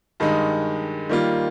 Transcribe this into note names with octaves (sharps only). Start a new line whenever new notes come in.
G2 D#3 G#3 D#4
D#3 G3 A#3 F4